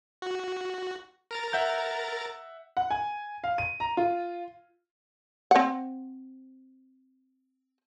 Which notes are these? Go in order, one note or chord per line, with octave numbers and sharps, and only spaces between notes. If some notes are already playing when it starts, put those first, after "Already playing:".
F#4
A#4 A#5 A6
E5 F#5 G6
F#5
G#5
F5
D#7
A#5
F4
C4 F#5